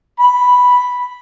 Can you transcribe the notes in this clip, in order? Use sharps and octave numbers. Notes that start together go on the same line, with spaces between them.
B5